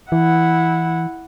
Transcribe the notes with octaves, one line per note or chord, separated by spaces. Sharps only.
E3 E4 F#5